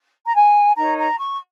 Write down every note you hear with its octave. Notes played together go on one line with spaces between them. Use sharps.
A#5
G#5
D#4 A#4 C#5 A#5
A#5
C#6